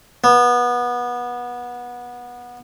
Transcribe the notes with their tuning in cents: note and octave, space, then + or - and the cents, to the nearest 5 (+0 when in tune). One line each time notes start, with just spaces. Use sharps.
B3 -20